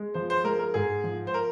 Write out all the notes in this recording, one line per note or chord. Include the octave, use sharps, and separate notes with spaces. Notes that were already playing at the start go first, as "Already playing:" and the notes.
Already playing: G#3
F3 C5
C5
G#3 A#4
A#4
G#2 G#4
F3
C5
A#4